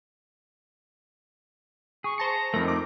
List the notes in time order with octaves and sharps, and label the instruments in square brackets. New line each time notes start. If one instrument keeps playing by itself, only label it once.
[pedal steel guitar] G#4 [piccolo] C#6
[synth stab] C5 A5 C#7 [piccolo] A#5
[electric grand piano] F2 A#4 [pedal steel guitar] A3 D#4
[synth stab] D6